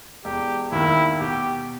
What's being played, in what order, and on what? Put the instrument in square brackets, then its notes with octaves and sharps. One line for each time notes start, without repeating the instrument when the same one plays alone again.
[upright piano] E1 [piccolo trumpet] G4
[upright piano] D#2 D#3 [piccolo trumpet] E4
[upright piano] B2 [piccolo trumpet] G4